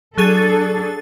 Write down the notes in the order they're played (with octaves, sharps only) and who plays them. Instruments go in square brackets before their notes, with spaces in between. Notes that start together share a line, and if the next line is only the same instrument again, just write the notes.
[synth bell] F#3 G#4 A6 [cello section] D4 A4